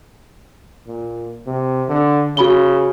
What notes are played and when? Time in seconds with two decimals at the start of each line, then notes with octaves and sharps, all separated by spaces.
0.88 A#2
1.47 C3
1.89 D3
2.37 C#3 F#4 B5 G7